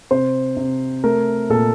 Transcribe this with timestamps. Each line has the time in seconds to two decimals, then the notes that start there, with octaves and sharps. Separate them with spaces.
0.11 C3 C5
0.57 C3
1.04 A3 A#4
1.50 A#2 A4